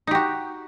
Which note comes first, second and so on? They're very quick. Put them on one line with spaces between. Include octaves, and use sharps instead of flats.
D#4 G4 F#4